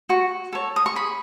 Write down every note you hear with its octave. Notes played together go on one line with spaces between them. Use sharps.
F#4 C#6
A4 C#5
D#6
C#6
G#4 B5